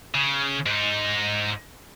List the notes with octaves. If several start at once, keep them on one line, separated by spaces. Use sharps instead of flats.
C#3
G#2 D#4